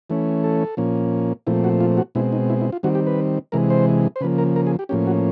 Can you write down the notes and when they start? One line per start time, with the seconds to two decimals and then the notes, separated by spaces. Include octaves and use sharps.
0.10 E3 A3 C#4
0.44 A4
0.77 A#2 F3 A#3 C#4
1.47 A#2 F3 A3 C4 E4
1.64 F#4
1.81 F4
1.97 F#4
2.15 B2 G#3 C4 E4
2.32 D#4
2.50 E4
2.61 E4
2.72 F4
2.83 D#3 G3 C4 F#4
2.95 G4
3.07 B4
3.52 C3 E3 G#3 A#4
3.70 C5
4.16 C5
4.21 C#3 F3 A#3 B4
4.38 A#4
4.56 A#4
4.67 G#4
4.79 G4
4.89 A2 F3 A#3 C#4 G4
5.07 F#4